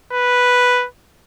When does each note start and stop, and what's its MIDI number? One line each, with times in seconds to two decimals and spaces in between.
0.13 0.86 71